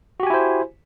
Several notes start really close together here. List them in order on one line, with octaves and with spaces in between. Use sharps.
F#4 G4 G#5 E4 C5